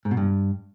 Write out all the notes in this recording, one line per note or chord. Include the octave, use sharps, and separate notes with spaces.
G#2
B2
G2